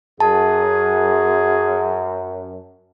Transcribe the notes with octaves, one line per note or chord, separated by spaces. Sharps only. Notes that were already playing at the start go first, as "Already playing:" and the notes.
F#2 G#4 A5